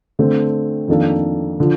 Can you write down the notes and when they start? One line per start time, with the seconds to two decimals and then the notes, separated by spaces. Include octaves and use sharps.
0.19 D3 A3 C4
0.88 F2 D#3 A#3 D4 A4
1.60 D3 F3